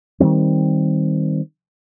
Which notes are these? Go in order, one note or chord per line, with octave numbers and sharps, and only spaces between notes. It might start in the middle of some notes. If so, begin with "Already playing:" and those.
D#3 E3 G3 C4